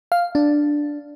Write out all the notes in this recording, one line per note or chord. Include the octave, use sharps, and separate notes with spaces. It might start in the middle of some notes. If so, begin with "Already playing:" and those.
F5
D4